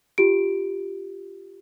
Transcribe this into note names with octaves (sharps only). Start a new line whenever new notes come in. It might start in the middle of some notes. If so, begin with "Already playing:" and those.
F4 G4 D7